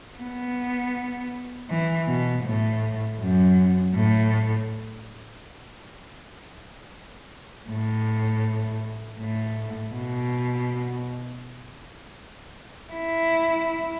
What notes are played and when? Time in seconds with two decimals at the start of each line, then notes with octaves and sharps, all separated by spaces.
0.20 B3
1.70 E3
2.08 B2
2.44 A2
3.19 F#2
3.94 A2
7.69 A2
9.19 A2
9.94 B2
12.93 E4